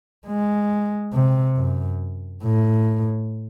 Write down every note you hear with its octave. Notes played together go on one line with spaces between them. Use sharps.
G#3
C3
F#2
A2